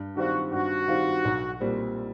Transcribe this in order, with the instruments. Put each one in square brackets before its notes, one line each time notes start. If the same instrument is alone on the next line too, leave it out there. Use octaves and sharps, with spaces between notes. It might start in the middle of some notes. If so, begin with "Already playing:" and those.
Already playing: [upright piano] G2
[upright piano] D#3 G3 C4 F4 [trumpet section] F#4
[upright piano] G2 [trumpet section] F#4
[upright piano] D#3 G3 C4 F4
B1
A#2 G3 C4